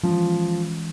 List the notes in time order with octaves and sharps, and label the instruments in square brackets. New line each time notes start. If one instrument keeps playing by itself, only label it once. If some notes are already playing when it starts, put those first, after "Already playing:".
[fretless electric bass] E3 G#3 C#4 [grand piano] F3